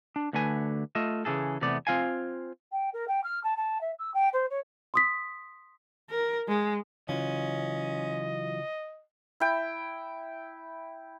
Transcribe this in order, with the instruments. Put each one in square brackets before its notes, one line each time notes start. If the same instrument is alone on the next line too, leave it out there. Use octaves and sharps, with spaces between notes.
[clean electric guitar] D4
D2 D3 A3 B4 G#5
A3 F4 D#5 E5
C#3 E3 G#4 A4
E2 C3 A3 B3 D5
C4 F4 F5 G#5
[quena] G5
A#4
G5
F6
A5
A5
E5
E6
G5
C5
C#5
[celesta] C6 D#6 B6
[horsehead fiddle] A#4
G#3
[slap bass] C#3 [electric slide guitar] E3 F#3 F4 [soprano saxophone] C#4 [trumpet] D#5
[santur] E4 G5